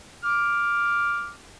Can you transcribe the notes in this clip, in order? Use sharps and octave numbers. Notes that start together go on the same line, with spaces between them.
D6 F6